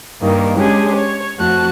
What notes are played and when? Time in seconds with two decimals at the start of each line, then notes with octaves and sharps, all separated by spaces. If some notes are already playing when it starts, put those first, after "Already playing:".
0.22 G2 D#3 G3 A#3
0.57 G#3 C#4 D4 G4 G#4
0.96 C#5
1.37 F2 A3 F#4 A5 F#6